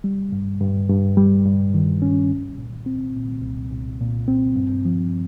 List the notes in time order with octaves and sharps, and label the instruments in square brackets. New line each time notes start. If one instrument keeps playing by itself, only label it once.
[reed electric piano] G3
G2
G2
G2
G3
G2
D#3
C#4
C2
A#2
C4
A#2
C2
C2
A#2
C4
G2
F3